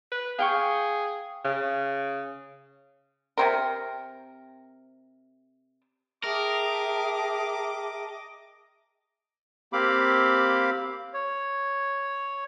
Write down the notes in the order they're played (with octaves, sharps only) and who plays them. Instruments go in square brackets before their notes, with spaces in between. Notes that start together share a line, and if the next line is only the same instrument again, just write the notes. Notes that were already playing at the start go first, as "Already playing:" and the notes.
[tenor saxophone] B4
[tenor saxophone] G#4 [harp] F5 G5 C#6
[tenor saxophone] C#3
[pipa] C3 C4 A#4
[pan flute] G#4 [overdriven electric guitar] A#4 [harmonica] D#5 D6 [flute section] E5 G5 A5
[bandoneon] A#3 C4 G4 F5 B5 D6
C#5